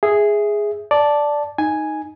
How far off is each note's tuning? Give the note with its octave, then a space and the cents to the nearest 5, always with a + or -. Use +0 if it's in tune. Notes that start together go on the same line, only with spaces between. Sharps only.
G#4 +0 E5 +0
D5 +0 A5 -5
D#4 +0 G#5 +0